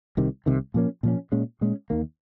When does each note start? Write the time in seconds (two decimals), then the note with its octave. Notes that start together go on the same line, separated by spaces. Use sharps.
0.17 C2 C3 D#3
0.46 C2 C3 D#3
0.74 A#2 F3 A#3 C#4
1.03 A#2 F3 A#3 C#4
1.32 A#2 G#3 C#4
1.61 A#2 G#3 C#4
1.90 D#2 D#3 A#3